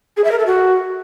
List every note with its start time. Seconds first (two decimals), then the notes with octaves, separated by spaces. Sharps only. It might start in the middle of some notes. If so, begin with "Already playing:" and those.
0.17 G#4
0.24 E5
0.31 A#4
0.39 A4
0.46 F#4